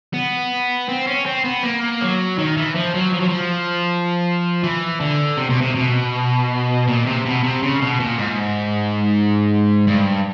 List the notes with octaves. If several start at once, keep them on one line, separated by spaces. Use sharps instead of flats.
B3
C4
C#4
C4
B3
A#3
F#3
D#3
E3
F3
F#3
F3
F#3
F3
E3
D3
C3
B2
C3
B2
A#2
C3
B2
C3
C#3
B2
A#2
G#2
G2